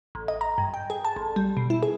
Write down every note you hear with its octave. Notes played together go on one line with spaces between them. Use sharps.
A1
D#5
A#5
G2
G5
G#4
A5
A1
G3
B2
E4
G#4